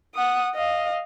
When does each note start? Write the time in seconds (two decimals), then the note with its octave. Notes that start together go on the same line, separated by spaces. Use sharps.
0.15 F#5 D#6
0.55 D#5 F5